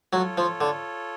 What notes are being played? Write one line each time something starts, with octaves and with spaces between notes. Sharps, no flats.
F#3 F4 A4 C#5
F3
D3